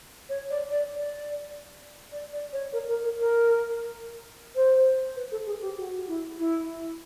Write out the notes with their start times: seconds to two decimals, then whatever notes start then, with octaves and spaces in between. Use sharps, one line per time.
0.29 C#5
0.50 D5
0.70 D5
0.91 D5
2.12 D5
2.33 D5
2.52 C#5
2.73 A#4
2.88 A#4
3.04 A#4
3.18 A#4
4.55 C5
5.16 B4
5.31 A4
5.46 G#4
5.61 G4
5.77 F#4
6.08 E4
6.38 E4